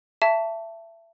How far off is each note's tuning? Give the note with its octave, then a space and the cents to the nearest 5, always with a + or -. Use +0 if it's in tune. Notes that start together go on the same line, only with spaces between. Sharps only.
E5 +25 A5 +10 C#6 +35